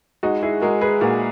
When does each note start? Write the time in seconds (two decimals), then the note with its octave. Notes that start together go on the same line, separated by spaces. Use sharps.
0.23 G#3 D#4 F#4
0.43 E4 G#4
0.62 G#3 F#4 A#4
0.81 G#4 B4
1.01 A#2 F#4 A#4